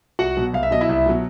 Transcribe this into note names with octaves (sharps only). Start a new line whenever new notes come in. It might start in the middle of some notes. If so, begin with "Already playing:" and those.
C2 F#4 F#5
B2 F#3
C2 F5
E5
B2 F#3 D#5
E4 E5
C2
B2 F#3